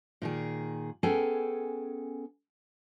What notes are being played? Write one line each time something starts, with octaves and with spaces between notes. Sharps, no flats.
A#2 D#3 G#4
B3 C#4 G#4 A4 G5 G#5